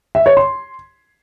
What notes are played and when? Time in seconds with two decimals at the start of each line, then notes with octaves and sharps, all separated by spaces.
0.15 E5
0.26 C#5
0.37 C6